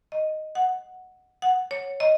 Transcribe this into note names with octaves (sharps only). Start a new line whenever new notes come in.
D#5
F#5
F#5
C#5
D#5